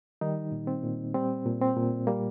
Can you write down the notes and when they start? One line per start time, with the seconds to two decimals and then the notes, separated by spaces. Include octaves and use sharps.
0.21 D#3 G3 D#4
0.52 A#2
0.67 C4
0.83 A#2
1.14 G3 C4
1.46 A#2
1.62 C4
1.77 A#2
2.07 G3 A#3